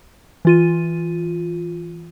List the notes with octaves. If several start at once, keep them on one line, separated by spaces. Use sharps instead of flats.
E3 F4 D#7